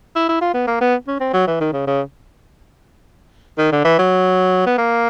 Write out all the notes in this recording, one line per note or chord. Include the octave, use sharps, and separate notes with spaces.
E4
E4
F4
B3
A#3
B3
C#4
C4
F#3
E3
D#3
C#3
C#3
D#3
D3
E3
F#3
B3
A#3